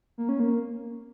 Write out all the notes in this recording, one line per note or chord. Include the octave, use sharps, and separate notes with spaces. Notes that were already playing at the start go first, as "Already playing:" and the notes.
A#3
C#4
A#3